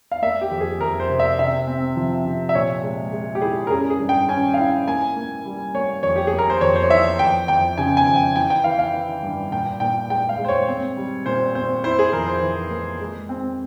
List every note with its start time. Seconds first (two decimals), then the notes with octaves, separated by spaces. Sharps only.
0.12 F5
0.22 A#3 E5
0.41 G4
0.51 F2
0.60 G#4
0.80 F2 A#4
1.00 C5
1.10 C3
1.20 E5
1.39 C3 E5
1.67 C4
1.96 F3
2.25 C3
2.49 E5
2.55 A#2 C#5
2.83 G#3
3.12 G#3
3.35 G4
3.41 E4 G#4
3.67 A#4
3.71 C#4 G#4
3.90 G#4
4.00 G2
4.09 G5
4.28 C#4 G#5
4.54 F5
4.58 E4 G5
4.87 A#3 G#5
5.16 A#3
5.45 G3
5.74 A#3 C#5
6.03 F2 C#5
6.16 G4
6.27 A#3 G#4
6.38 A#4
6.50 C5
6.61 F2 C#5
6.76 C5
6.83 C#5
6.90 E3 E5
7.19 F2 G5
7.48 F2 G5
7.78 C#3 G#5
7.97 G#5
8.06 F2
8.16 G5
8.36 E3 G5
8.50 G5
8.64 E3 F5
8.79 F5
8.94 E4
9.23 G2
9.52 A#2 G5
9.80 A#2 G5
10.10 G#3 G5
10.29 F5
10.39 G#3
10.45 C5
10.48 C#5
10.68 C4
10.97 G3
11.26 A#2 C5
11.55 C4 C5
11.84 E4 C5
11.99 G#4
12.13 F2 A#4
12.28 C5
12.42 E3
12.70 A#3
13.01 G#3
13.29 C4